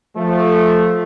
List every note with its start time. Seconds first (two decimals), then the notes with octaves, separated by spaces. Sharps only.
0.16 F3 A3